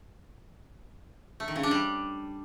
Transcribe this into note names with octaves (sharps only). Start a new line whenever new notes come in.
A3
D#3
C#3
D4
G3